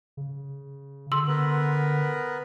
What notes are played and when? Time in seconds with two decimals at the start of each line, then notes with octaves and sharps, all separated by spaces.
0.17 C#3
1.12 D3 C6 E6 F#7
1.28 B3 A#4 B4